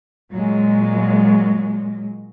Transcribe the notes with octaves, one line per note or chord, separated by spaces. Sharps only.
A#2 F#3 G#3